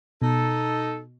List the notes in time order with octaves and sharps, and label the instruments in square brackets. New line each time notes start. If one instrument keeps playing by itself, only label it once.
[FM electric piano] B2 [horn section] D#4 A4